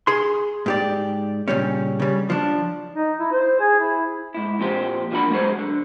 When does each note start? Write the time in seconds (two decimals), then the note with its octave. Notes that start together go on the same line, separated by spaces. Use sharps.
0.07 G#4 C6
0.66 G#2 G4 D5
1.48 A#2 C#3 G3 C#4
2.00 C#3 G3
2.30 F3 D4
2.94 D#4
3.20 E4
3.32 C5
3.60 G#4
3.79 E4
4.34 G#2 E4
4.59 F2 A#2 F3 G4 C5
5.11 G2 F3 A#3 D4 F#4 B5
5.30 D2 G#2 F#3 B3 G#4 C5
5.59 D3